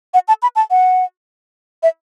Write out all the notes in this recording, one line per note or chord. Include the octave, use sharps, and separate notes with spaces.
F#5
A5
B5
A5
F#5
E5